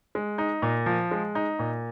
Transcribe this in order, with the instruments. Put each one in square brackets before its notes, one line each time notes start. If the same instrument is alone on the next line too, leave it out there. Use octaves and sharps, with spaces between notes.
[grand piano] G#3
D#4
A#2
F3
G#3
D#4
A#2